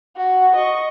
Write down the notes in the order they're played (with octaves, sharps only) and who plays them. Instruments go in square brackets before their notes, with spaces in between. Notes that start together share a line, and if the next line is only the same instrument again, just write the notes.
[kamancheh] F#4
D#5 C#6